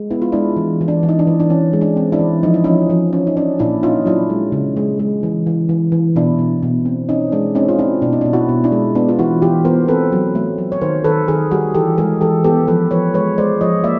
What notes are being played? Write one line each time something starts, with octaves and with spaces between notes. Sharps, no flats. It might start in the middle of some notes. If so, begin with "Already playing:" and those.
Already playing: G#3
B3 E4
F4
G#3 D4 E4
E3
E3
D4
E3
D#4
D4
E3
D4
E3 C#4
G#3
D4
C4
D4 E4
E3
F3 D#4
E4
F3 C#4 D#4
F3
C#4
D#4
C#4 D4
A#2 D4 E4
C#4 D#4 F4
F#3 D4 E4
G#3
C#3
G#3
G#3
E3
E3
E3
E3
B2 D4 E4
B2
B2
C4
C4 C#4 D#4
G#3 D4
C4 C#4 D#4
F4
C4 D4 E4
B2 D4
D#4
B2 D4
E4 F#4
B2
D4 E4
G#3
B3 D4
F4
E3 E4 F#4
E3 F4 G4
B3 A#4 C5
C4 A4 B4
F#3
A3
F#3
C#5
D#3 A#4 C5
D#3 A4 B4
D#3 G#4 A#4
G3 F#4 G#4
E3 G4 A4
G#3 G#4 A#4
E3 G4 A4
B3 G4 A4
F3 A4 B4
F3 B4 C#5
G#3 B4 C#5
G#3 C5 D5
F3 C#5 D#5
A#3 D5 E5